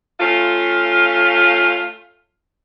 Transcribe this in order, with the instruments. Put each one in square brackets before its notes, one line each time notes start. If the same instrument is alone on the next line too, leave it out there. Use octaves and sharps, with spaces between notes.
[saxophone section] A3 C#4 F4